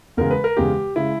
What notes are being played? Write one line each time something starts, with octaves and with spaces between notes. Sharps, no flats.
E2 C#3 G#3 A#4
B4
A#4
E2 C#3 G#3 G4
C#3 G#3 E4